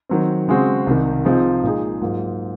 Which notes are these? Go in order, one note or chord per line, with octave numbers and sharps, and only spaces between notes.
D#3 F#3 C4
C#3 G#3 C4 F#4
C2 C3 D#3
C3 F3 C4 D#4 G#4
A#2 G#3 D#4 G#4
G#2 F#3 A#3 F4